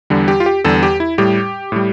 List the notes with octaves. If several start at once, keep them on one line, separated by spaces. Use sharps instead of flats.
E2 D3 G3
G4
F4
G4
E2 D3 G3 A4
G4
E4
A2 G3 G4
A2 G3